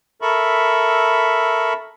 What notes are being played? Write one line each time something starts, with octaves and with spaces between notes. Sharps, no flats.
A4 A#4 E5 B5 C#6